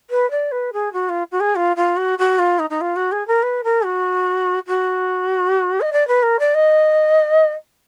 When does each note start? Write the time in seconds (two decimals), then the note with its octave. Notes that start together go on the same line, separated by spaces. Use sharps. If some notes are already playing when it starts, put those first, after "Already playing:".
0.10 B4
0.31 D5
0.52 B4
0.73 G#4
0.93 F#4
1.09 F4
1.32 F#4
1.40 G#4
1.56 F4
1.76 F4
1.97 F#4
2.19 F#4
2.39 F4
2.59 D#4
2.70 D#4
2.81 F4
2.96 F#4
3.12 G#4
3.28 A#4
3.43 B4
3.64 A#4
3.85 F#4
4.67 F#4
5.81 D#5
5.93 D5
6.08 B4
6.23 A#4
6.39 D5
6.55 D#5